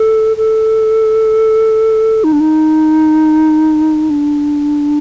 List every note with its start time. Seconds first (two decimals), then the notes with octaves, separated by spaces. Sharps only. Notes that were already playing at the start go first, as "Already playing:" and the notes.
Already playing: A4
0.37 A4
2.24 D#4
2.32 D4
2.40 D#4
4.10 D4